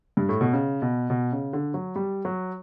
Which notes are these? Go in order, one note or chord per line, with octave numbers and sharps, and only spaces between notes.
G2
A2
B2
C#3
B2
B2
C#3
D3
F#3
G3
F#3